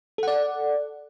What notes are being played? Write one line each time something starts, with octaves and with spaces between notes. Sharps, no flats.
A4 D5 F#5